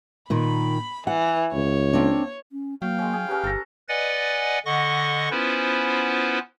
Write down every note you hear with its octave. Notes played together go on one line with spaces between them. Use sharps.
A#2 D#3 B5
E3 F#5
C#2 C#5
A#3 C4 D4
C#4
F#3 A#3 F5 G5
G#3 C#4
G#4
C#4 G4 A#4 B4
G1 A4 A#5
B4 D5 D#5 F#5 G#5 A6
D3 D#5 F#5 C#6 A#6
B3 C#4 E4 F4 B4 C5